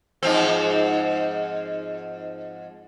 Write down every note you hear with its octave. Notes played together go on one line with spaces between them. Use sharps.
G#2 F3 C4